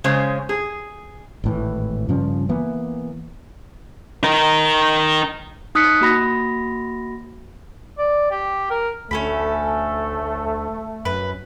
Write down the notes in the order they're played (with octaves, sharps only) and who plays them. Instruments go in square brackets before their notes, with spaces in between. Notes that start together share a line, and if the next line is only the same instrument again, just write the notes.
[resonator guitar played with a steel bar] C#3 G#3 C#4 C5
G#4
[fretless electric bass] G#1 A2 E3
G2 C#3 F3 C#4
E3 A#3 B3
[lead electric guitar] D#4 A#4
[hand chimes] D#4 D#6 F#6 B6 C#7
A#3 F#4 B5 A#6
[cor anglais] D5
G4
A#4
[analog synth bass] D2 [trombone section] A3 [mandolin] C#4 A4 B5
[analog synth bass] F#2 [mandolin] B4